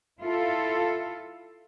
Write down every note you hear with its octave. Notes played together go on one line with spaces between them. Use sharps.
E4 F4 A4